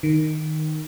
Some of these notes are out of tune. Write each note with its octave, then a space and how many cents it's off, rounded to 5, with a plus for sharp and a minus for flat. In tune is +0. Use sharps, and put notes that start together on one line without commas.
D#3 -5